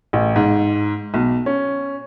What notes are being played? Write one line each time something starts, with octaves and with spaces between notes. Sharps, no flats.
A1
G#2
B1
C#4